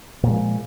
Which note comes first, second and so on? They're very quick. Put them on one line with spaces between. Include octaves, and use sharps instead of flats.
A#2 G#3 F3